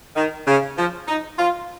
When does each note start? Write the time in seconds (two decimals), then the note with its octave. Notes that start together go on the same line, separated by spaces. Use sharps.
0.16 D#3
0.47 C#3
0.77 F3
1.08 D#4
1.39 F4